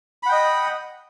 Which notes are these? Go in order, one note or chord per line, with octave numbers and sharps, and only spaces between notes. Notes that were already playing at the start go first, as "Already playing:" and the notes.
D#5 F#5 G5 B5